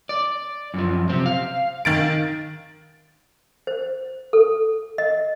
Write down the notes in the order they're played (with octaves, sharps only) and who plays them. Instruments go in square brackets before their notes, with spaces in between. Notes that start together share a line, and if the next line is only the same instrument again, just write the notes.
[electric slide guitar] D5
F#2 F3
C3 C4
F5
[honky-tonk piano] D#3 A6 D7
[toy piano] C5
A4
D#5